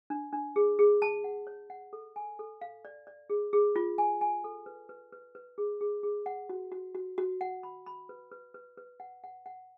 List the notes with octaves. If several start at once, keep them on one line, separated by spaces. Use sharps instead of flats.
D4
D4
G#4
G#4
A5
F#5
C#5
F#5
A4
G#5
A4
F5
D5
D5
G#4
G#4
F4
G#5
G#5
A4
B4
B4
B4
B4
G#4
G#4
G#4
F#5
F#4
F#4
F#4
F#4
F#5
B5
B5
B4
B4
B4
B4
F#5
F#5
F#5